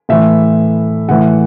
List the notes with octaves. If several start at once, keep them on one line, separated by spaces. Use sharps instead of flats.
A2 E3 E5
A2 E3 F#5